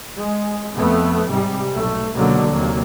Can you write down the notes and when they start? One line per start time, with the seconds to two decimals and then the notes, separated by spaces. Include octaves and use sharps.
0.19 G#3
0.74 F2 A3 B3
1.29 G#2 C3 G3
1.73 B1 A3
2.16 C#2 B2 D3 F#3 A#3
2.51 D#2 C3 F#3 A#3